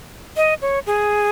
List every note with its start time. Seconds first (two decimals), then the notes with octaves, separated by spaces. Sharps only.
0.37 D#5
0.62 C#5
0.87 G#4